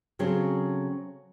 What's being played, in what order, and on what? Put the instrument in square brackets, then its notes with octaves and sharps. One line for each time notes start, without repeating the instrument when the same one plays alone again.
[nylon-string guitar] C#3 F#3 C4 C#4 G#4 A4